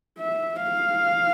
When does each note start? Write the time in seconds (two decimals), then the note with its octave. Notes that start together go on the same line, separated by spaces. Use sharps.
0.19 E5
0.63 F5